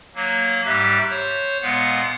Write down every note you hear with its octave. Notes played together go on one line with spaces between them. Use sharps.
F#3 A#3
G#2 G3 G4 E5 F#6
C5 C#5
A#2 G#3 B3 F5 F#5